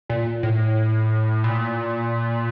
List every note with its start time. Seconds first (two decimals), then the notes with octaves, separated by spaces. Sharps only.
0.09 A#2
0.43 A2
1.44 A#2